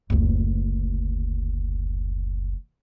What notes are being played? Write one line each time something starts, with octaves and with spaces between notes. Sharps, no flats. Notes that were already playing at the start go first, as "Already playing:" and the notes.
F#1 D2